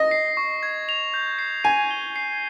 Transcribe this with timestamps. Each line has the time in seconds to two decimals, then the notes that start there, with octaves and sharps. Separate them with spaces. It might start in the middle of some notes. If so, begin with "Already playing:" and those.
Already playing: D#5 A#6
0.11 C7
0.37 C#6
0.63 G#6
0.89 F7
1.14 G6
1.39 C7
1.64 G#5 D#7
1.91 G7
2.16 C7